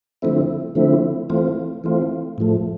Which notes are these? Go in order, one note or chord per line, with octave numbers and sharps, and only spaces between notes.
D3 F3 A3 C4 E4
D3 F3 A3 C4 E4
E3 A3 C4 F4
E3 A3 C4 F4
A2 F3 A3